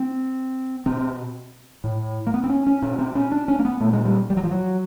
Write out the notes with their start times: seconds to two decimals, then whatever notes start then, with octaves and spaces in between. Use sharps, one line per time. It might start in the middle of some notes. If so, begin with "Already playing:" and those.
Already playing: C4
0.86 B2 C4
1.84 A2
2.27 A#3
2.34 B3
2.44 C4
2.49 C#4
2.67 C#4
2.82 B2 C#4
2.98 C4
3.15 C#4
3.32 D4
3.48 C#4
3.59 A#3
3.65 B3
3.80 A#2 A3
3.93 G#3
4.05 G3
4.30 G3
4.37 F#3
4.43 F3
4.51 F#3